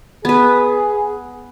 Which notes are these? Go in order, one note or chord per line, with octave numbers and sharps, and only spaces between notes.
B3 G#4 B4